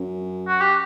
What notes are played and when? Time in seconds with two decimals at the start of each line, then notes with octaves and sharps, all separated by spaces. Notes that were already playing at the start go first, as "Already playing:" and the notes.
Already playing: F#2
0.47 F#4
0.60 G4